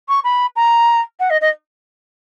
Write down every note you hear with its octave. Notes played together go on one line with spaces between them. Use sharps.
C#6
B5
A#5
F#5
D#5
D#5